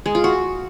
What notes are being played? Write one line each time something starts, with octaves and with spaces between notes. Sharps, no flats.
G#3
F4
F#4